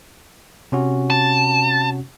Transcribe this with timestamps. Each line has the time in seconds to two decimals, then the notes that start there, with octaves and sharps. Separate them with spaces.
0.72 C3 C#4 F#4
1.10 A5